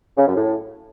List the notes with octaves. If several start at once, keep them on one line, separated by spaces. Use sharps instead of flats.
C#3
F#2
A2